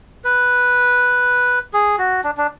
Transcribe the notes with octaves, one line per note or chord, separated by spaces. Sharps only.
B4
G#4
F#4
D4
D4